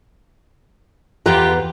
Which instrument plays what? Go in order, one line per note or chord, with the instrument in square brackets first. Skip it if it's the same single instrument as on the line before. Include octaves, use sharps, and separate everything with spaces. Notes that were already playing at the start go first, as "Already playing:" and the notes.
[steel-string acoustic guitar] E2 B4 A#5 [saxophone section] F4 G4